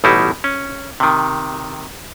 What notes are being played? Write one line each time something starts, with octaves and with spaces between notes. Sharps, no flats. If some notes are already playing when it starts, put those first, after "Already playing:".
A1 B2 G3 D#4 E4
C#4
C3 D#3